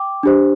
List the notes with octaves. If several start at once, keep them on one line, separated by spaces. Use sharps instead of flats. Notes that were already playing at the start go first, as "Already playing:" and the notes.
Already playing: G5 D6
D4 G4 C5